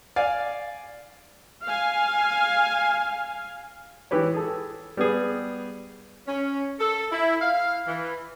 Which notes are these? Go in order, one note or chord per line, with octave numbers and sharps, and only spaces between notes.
D5 F5 G#5
F5 G#5
E3 E4 G4 B4 C#5
G#4 A4
G3 B3 G#4
C#4
A4
E4
F5
E3